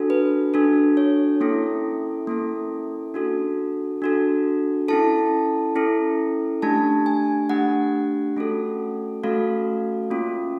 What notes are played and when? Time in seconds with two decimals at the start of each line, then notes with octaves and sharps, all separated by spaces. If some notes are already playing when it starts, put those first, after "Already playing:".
Already playing: D4 F#4 A4
0.10 B4
0.54 D4 F#4 A4
0.97 C#5
1.41 A#3 C#4 E4 A4
2.27 A#3 C#4 E4 A4
3.14 D4 F#4 A4
4.02 D4 F#4 A4
4.88 C#4 E4 A4 A5
5.75 C#4 E4 A4
6.62 A3 D4 G4 A5
7.06 G#5
7.49 A3 D4 G4 F#5
8.36 A3 C#4 F#4 A4
9.23 A3 C#4 F#4 A4 F5
10.10 A#3 C#4 F4